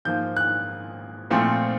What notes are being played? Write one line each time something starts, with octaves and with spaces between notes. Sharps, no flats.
G#2 F3 A#3 G6
F#6
A#2 F3 A3 C4